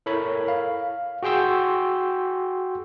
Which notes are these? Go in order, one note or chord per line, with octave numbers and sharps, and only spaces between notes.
E4 A4 A#4 C#5 B5
F5
F#4 G#4 G5 C6 E6